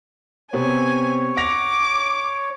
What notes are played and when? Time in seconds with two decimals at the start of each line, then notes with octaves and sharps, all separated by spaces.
0.53 C3 B3 C4 C#5 G#5
1.37 F#5 D6 A#6 F7